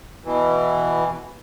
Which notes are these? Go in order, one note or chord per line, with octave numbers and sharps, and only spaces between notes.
B2 E3